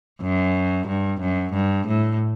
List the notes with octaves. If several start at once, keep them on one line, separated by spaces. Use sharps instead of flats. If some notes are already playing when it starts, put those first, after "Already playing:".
F#2
G2
F#2
G2
A2